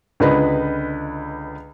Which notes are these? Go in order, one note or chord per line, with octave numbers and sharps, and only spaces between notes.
C#2 D3 B4 D#5 B5